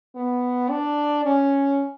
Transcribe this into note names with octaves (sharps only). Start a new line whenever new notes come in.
B3
D4
C#4